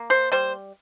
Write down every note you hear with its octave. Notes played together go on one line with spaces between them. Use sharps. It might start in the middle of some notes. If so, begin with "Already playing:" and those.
Already playing: A#3
C5
G3 C5